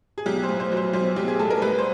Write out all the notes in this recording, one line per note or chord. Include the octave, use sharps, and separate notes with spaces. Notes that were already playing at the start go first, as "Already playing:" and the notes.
G#4
B1 G4
C5
A2
C5
F#3
C5
B1 C5
B1 G4
G#4
A2 A4
A#4
C2 B4
C5